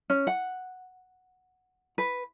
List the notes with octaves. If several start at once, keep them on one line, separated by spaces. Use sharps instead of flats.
C#4
F#5
B4